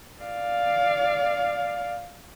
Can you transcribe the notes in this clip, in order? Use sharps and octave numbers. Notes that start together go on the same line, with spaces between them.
D5 F5